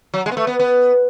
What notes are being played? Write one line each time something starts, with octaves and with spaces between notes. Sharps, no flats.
F#3
G#3
B3
A3
B3
B3